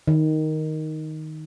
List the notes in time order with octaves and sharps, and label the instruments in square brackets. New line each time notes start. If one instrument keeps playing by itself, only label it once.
[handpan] D#3